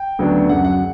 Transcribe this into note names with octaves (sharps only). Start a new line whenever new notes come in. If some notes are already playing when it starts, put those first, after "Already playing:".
Already playing: G5
D2 C#3 F#3 B3 D4
F#2 C#3 F#3 F#5
F#5